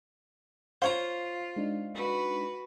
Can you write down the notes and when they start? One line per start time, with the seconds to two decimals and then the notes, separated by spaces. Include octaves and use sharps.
0.82 F4 C5 C#5 F5 A#5
1.56 G#3 D4 D#4
1.94 F#4 B4